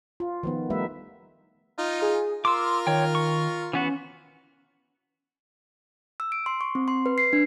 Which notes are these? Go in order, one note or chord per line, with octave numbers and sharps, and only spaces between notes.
F4
D#3 F3 B3
G3 A3 D#4 B4 E5
D#4 F4
G#4
F4 A#4 C6 D6 E6
D#3 C#5 G5
C#6
E3 B3 C#4 F#4
E6
D7
C6
C#6
C4
C6
B4
C7
D4